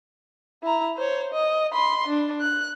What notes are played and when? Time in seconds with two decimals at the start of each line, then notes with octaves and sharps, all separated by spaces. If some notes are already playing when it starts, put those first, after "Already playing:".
0.63 E4 A#5
0.97 C5 C#5
1.33 D#5
1.73 B5 C6
2.07 D4
2.41 F#6